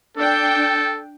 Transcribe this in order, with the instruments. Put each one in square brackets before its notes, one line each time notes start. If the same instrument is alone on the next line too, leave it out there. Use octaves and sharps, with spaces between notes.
[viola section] D4 G5 [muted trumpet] A4